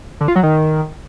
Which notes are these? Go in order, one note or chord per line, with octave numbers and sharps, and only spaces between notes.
D3
F4
F#3
D#3